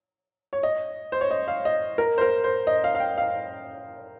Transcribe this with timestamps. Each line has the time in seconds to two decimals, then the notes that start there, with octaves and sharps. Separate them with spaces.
0.53 C#5
0.63 D#5
1.12 C5
1.21 C#5
1.31 D#5
1.48 F5
1.65 D#5
1.98 A#4
2.18 C5
2.21 A#4
2.44 C5
2.67 D#5
2.84 F5
2.95 F5
3.00 G5
3.18 F5